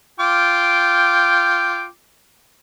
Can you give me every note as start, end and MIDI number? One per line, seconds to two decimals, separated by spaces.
0.20 1.86 65
0.20 1.86 79
0.20 1.86 86